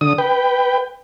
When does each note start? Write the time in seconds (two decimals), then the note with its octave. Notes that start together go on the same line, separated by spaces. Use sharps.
0.01 D3 D#6
0.18 B4 G5